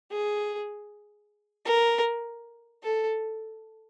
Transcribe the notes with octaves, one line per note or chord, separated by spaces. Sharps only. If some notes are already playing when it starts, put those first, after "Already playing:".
G#4
A#4
A4